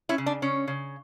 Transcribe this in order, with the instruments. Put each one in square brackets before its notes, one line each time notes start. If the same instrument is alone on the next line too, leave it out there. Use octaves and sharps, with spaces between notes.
[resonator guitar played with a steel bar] C#4 E4
C#3
D4
C#3 C#4
C#3